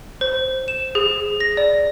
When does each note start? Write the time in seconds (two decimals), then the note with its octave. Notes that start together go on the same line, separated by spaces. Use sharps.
0.21 C5
0.68 E7
0.95 G#4
1.40 A#6
1.57 D5